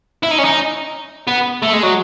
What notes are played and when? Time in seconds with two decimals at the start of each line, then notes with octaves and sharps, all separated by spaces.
0.23 E4
0.31 D#4
0.39 C#4
0.45 D#4
1.28 B3
1.63 A3
1.73 G#3
1.83 F#3